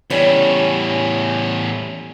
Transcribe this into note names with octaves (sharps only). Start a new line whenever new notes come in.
E2 A2 G3 C#4